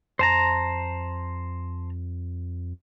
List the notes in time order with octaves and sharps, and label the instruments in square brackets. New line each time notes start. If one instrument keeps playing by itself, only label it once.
[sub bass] F2 [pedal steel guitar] C5 A5 A#5